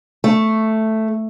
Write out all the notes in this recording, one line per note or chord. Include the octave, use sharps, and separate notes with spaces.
A3